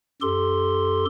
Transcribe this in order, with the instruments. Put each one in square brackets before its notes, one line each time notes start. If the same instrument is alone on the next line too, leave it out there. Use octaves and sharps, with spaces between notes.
[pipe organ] F#2 G4 A4 C6